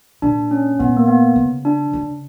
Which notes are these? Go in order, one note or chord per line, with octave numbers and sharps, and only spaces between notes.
A#2 D4
C#4
A#2 B3
A#3
B3
C#3
D4
C#3